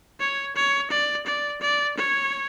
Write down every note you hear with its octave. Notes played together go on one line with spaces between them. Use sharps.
C#5
C#5
D5
D5
D5
C#5